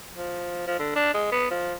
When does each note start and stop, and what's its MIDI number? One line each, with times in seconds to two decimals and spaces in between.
0.16 0.64 53
0.67 0.78 53
0.79 0.94 50
0.96 1.14 62
1.14 1.28 56
1.31 1.50 59
1.50 1.74 53